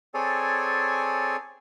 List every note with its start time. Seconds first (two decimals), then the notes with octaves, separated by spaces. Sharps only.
0.14 C4 G#4 A4 C#5 D5 G#5